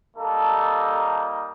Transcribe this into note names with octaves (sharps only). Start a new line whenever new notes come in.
G3 A#3 D#4 A4